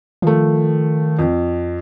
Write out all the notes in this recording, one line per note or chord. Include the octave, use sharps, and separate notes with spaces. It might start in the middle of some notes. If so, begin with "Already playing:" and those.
D#3 F3 A3
F2